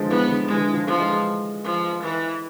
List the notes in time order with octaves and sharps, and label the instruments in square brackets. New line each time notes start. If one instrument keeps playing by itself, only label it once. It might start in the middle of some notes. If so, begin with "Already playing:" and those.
Already playing: [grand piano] D3 F3 G#3
[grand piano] E3 [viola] B3
[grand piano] D3
[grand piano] E3 [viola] G#3
[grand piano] D3
E3
D3 F3
[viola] F3
[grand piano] E3 G#3
[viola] F3
E3